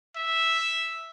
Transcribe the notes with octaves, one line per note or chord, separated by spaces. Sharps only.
E5